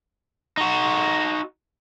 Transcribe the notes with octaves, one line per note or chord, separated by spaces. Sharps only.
D#4 F#4